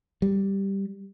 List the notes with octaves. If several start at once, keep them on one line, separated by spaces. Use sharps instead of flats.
G3